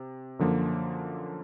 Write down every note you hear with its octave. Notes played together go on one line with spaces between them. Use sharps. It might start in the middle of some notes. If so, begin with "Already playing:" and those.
Already playing: C3
F#2 D3 F3 A#3